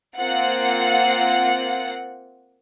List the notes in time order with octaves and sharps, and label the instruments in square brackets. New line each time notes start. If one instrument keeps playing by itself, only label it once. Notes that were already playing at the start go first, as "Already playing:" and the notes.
[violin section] A#3 C4 F4 F#5